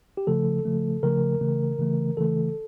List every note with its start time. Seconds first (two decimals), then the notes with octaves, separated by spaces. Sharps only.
0.17 G4
0.27 C#3 F3 A3 A4
0.65 C#3 F3 A3
1.03 C#3 F3 A3 A#4
1.41 C#3 E3 A3
1.79 C#3 E3 A3
2.17 C#3 E3 A3 A4